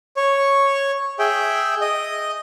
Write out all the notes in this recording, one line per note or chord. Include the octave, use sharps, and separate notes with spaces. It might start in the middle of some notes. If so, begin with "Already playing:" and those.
C#5
G#4 E5 G5
D#5